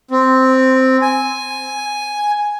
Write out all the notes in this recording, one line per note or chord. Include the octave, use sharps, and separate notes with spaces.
C4
G#5